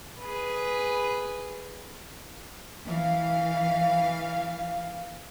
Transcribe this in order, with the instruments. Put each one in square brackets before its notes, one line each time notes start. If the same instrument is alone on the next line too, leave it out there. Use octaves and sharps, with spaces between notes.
[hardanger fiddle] G#4 B4
[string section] E3 F5